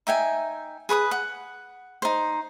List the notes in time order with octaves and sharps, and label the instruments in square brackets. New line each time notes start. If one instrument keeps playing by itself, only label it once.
[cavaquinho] D#4 E5 G5 G#5
G#4 B4 C6 D#6
F#5
D#4 C5